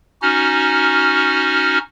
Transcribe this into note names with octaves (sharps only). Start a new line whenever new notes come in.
C#4 D#4 F#4 F6